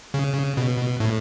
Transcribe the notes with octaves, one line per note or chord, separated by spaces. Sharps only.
C#3
B2
A2